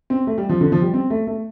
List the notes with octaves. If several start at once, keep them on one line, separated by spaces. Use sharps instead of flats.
C4
A3
G3
F3
D3
F3
G3
C4
A3
A3